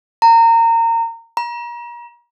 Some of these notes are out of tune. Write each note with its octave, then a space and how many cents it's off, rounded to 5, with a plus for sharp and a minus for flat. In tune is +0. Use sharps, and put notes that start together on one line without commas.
A#5 -25
A#5 +40